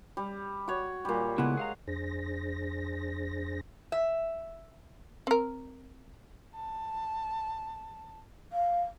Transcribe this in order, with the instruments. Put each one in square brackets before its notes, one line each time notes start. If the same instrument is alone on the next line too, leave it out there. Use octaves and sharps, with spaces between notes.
[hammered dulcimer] G3
F#4 C#5
A#2 G3
[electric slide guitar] C#3 B3 E4 [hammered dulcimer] G#3 F#5
[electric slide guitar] G#4 F5 A#5
[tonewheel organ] F2 D4 G#4 C5 A#6
[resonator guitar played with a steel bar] E5
[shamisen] C4 A#4
[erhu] A5
[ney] F5